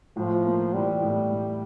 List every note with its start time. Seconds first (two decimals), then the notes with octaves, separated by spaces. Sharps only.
0.17 A2 F3
0.46 A#3
0.74 E3 G3
1.02 A2
1.31 A2